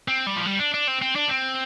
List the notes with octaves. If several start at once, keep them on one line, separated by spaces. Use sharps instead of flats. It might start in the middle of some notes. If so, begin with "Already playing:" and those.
C4
G3
F3
G3
D4
D4
C4
C4
D4
C4